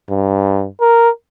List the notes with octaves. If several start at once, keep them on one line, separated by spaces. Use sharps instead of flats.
G2
A#4